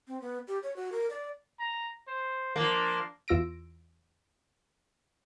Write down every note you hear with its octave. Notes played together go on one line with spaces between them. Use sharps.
C4
B3
G4
C#5
F#4
A#4
D5
A#5
C5
F3 A#3 D4
E2 F4 E6 A#6 D7